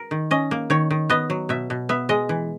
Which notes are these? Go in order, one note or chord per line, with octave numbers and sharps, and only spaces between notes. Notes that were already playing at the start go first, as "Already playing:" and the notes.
Already playing: A#4
D#3
C#4 D#5
A#3
D#3 C#5
D#3
B3 D#5
F#3
B2 E5
B2
B3 E5
G#3 D#5
E3